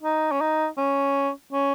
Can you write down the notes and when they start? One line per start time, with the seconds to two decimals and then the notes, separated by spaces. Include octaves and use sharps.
0.03 D#4
0.32 C#4
0.41 D#4
0.78 C#4
1.53 C#4